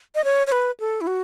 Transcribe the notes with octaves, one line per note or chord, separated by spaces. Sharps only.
D#5
C#5
C#5
B4
A4
E4
F#4